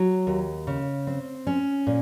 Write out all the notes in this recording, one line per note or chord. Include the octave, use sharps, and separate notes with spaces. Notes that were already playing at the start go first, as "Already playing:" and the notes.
Already playing: F#3
D#2
C#3
C4
C#4
A#2